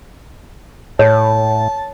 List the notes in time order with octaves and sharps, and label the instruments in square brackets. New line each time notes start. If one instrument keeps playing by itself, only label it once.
[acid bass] A2 [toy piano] C#5 [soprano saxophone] A5